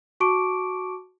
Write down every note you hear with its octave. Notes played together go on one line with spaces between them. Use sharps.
F#4 A5 C#6 D6 D7